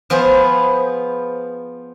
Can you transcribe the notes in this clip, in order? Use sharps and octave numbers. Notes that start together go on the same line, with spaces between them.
F3 B3 F4 G#4 C5